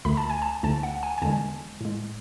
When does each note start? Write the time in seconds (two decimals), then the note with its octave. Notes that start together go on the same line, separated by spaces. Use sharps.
0.05 D2 D3 A3 B5
0.17 A5
0.29 G#5
0.42 A5
0.63 D2 D3 A3 A5
0.83 F#5
1.03 G#5
1.18 G#5
1.22 E2 D3 G#3 A5
1.81 A2 G#3